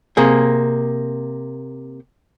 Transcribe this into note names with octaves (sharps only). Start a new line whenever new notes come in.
C3 A#3 G#4